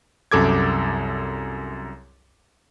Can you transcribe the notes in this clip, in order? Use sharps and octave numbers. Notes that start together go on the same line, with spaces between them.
C2 F#2 A4 D6 G#6